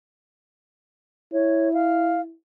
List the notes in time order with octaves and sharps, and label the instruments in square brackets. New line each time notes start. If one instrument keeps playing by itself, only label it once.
[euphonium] E4 [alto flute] C#5
[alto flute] F5